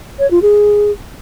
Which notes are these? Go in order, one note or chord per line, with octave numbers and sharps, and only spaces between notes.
C#5
F4
G#4